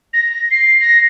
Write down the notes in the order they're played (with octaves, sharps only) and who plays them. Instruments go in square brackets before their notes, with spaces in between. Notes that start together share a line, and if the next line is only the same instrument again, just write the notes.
[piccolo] A#6
C7
A#6